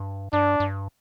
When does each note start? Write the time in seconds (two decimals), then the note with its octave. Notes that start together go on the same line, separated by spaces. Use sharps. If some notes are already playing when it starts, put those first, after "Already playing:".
Already playing: G2
0.33 G2 D4
0.60 G2